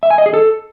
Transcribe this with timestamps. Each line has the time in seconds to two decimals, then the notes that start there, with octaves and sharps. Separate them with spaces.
0.03 E5
0.10 G#5
0.18 D#5
0.26 G#4
0.34 A4